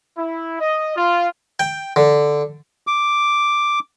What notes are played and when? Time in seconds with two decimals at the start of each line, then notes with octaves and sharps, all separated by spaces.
0.17 E4
0.60 D#5
0.97 F4
1.60 G5
1.96 D3
2.87 D6